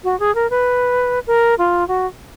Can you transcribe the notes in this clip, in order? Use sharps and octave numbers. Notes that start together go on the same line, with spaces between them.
F#4
G#4
A#4
B4
A#4
F4
F#4